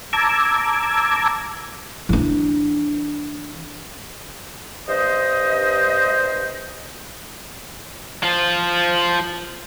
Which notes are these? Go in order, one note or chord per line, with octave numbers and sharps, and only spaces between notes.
A5 A#5 D6 E6 G#6
E3 D4
G2 C5 D#5
F3 F4